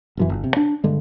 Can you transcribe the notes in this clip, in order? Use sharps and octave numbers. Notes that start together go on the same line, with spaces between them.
E1 F#2 E3
G1
C3
D4
G2 D3 G#3